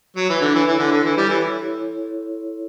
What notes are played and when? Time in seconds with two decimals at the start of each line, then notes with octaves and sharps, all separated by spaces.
0.16 F#3 C#5
0.29 E3
0.35 E4
0.41 D3
0.54 E3 E4
0.67 E3
0.73 A4
0.78 D3
0.92 D3 C#5
1.04 E3
1.10 E4
1.17 G3
1.29 E3 E4